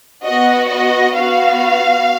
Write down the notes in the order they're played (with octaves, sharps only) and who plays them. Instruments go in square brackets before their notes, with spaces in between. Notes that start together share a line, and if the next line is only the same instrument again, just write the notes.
[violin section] B3 F#4 D#5
D#5
B3 F#4 F5